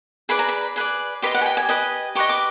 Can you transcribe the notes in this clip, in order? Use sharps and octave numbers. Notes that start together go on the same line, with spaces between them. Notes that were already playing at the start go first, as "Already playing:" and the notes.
G#4 B4 D5 B5
A#5
B5
G#4 B4 D5
G4 B4 D#5 C6
F#5
G#5
G5
G#5
G4 B4 D#5
G4 B4 D#5 C#6
D6